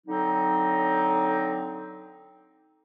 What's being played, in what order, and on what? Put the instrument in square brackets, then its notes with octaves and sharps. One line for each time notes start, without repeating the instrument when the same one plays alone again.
[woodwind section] D3 F#3 C4 D#4